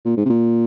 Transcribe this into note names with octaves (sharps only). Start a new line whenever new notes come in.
A#2
G#2
C3
A#2